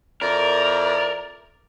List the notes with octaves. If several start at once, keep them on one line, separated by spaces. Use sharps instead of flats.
F2 E4 A#4 D5